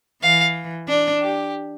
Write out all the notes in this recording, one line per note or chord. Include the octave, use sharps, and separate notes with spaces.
E3 F5
D4
G4